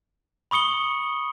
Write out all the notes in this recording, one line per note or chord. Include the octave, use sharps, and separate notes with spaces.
B5 C#6 D#6 C#7 G7